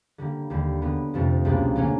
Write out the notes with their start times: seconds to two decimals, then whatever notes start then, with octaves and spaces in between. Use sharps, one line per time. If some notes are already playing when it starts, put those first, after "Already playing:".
0.18 D3 G3 A#3
0.50 D#2 D3 G3
0.82 D3 F#3 B3
1.14 F2 C3 F3 A3
1.45 C#2 B2 G3 A#3 D4
1.76 D3 F#3 A#3 C#4